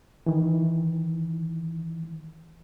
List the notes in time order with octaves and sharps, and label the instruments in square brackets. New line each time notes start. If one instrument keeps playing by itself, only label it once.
[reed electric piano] D#3 E3